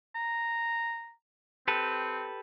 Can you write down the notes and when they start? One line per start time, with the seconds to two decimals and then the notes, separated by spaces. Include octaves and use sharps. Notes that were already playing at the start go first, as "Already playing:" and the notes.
0.15 A#5
1.68 C4 G4 A4 B4